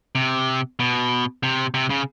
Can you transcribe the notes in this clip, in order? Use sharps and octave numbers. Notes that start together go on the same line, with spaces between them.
C3
B2
C3
C3
C#3